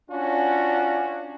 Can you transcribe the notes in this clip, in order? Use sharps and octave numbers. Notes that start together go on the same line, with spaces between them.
C#4 D4 F4 F#4